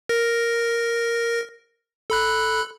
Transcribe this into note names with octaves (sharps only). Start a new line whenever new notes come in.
A#4 A#6
A4 B5 F#6